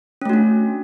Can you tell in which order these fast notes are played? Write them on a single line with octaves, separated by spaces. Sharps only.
C#4 A3 F#4 D4